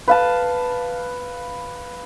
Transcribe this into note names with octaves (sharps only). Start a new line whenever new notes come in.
B4 F5 A5